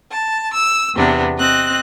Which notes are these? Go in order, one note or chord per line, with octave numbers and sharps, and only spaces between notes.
A5
E6
E2 C3 B3 D4
C4 D#5 F#6